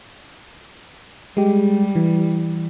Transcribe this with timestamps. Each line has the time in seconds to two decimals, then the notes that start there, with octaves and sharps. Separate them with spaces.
1.37 G3 G#3 G4
1.95 E3